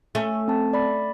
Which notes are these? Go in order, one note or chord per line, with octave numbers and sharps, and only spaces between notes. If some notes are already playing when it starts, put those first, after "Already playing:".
A3 C#4
C4 A5
D5 B5